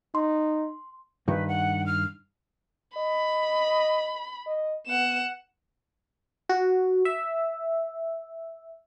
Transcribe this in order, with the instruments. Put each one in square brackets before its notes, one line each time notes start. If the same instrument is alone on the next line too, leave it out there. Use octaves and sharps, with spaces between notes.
[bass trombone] D#4 [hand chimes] C6
[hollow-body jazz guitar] G2 D#3 [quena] B4
[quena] F#5
F6
[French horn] D#5 [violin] B5
[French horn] D#5
[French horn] B3 [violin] F#5 E7
[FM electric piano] F#4
E5